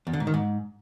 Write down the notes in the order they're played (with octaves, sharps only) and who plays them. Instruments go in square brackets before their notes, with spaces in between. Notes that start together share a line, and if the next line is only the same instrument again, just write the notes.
[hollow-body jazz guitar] E2
D3
G#2
D#3
G#2